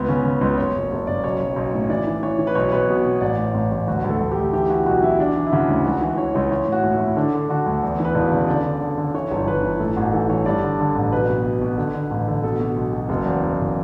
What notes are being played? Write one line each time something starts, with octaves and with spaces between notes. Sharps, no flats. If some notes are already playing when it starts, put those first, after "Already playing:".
Already playing: C#2 B3
C#3 C#4
C#3
C#2 B4
F#1 C#5
F#1
F#1 C#5
F#1 D5
B1 C#5
B1
B1
A2
E3 D5
E3
E3 C#5
E3
B4
B1 C#5
B1 B4
B2
B2
A1 D5
A2
C#5
A1
A1
D2 F#4
D2
A4
D2
G4
D2
E3 G4
E3 F#4
B1 F#4
E3 E4
E3 D4
E3
E4
C#3 F#4
D2
C#2 F#4
E3
E3 C#5
C#2 C#5
E3 C#5
A2
F#4
A2
E4
A2
D3 D4
D3
D3 F#4
D2
E2
E3 B4
E1
C#3
D3 D5
D3
D3
D3
E3 C#5
G1
G1 B4
E3
A2 A4
A1 F#4
E3 A4
E3 C#5
G2 D5
D3
D3
A1
B1 B4
B2
B2
B2
D3
D3
A1
D3
B2 A4
B2
B1
B1
F#1
E2
E2
F#1